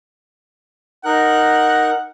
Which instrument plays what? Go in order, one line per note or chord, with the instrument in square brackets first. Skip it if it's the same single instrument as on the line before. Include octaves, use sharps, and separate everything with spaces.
[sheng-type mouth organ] D#4 A#4 F#6 [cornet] F#5